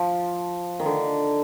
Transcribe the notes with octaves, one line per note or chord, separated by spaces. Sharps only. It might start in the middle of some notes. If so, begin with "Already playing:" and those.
Already playing: F3
D#3
D3